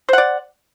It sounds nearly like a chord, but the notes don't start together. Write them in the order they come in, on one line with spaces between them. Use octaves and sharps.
C5 F#5 D5